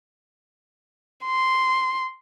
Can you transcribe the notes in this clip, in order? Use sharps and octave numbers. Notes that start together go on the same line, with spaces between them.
C6